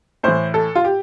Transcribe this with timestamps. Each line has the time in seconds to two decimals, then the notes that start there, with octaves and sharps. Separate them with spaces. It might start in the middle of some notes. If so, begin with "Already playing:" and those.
0.23 A2 E3 C5
0.54 A4
0.75 F4
0.85 G4